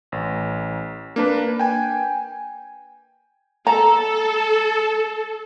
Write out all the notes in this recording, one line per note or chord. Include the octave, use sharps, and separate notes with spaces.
A1
A#3 D4 B4
G5 G#5
A4 A#5